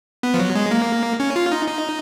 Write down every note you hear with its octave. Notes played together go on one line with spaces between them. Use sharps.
B3
F3
F#3
G#3
A#3
C#4
F4
D#4
D#4